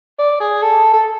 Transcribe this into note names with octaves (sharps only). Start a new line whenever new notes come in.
D5
G#4
A4
A4